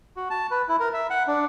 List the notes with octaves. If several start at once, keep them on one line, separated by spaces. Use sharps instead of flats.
F#4
A5
B4
E4
A#4
E5
F#5
D4